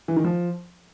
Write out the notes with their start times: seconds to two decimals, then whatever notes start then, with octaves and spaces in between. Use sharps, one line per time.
0.08 E3
0.16 D#3
0.25 F3